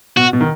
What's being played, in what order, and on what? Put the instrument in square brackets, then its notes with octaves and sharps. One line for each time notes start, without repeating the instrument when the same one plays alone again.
[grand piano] B2 [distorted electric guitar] F#4
[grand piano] B2
D#3